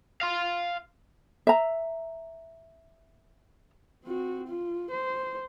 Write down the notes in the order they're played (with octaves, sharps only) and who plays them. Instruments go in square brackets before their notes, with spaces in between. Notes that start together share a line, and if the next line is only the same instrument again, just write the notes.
[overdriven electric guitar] F5 C6
[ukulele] E5 A#5
[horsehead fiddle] C4 F#4
F4
C5